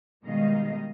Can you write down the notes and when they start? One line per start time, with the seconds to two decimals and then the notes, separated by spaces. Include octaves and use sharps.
0.24 B2 D#3 G3 G#3 D#5 F5